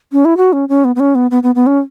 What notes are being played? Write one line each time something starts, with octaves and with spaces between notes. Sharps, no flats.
C#4
E4
F#4
C#4
C#4
B3
B3
C#4
B3
B3
B3
B3
C#4